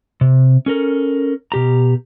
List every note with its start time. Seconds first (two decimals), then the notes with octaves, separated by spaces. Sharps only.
0.21 C3
0.66 C#4 A4 A#4
1.52 B2 G4 A#5